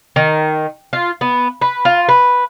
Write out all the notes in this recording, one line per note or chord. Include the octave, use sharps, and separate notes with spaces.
D#3
F4
B3
B4
F4
B4